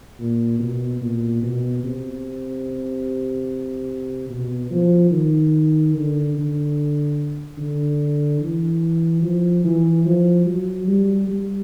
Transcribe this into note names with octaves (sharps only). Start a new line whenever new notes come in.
A#2
B2
A#2
B2
C3
B2
F3
D#3
D3
D3
D3
E3
F3
E3
F3
F#3
G3
G3